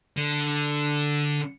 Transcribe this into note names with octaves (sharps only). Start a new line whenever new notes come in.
D3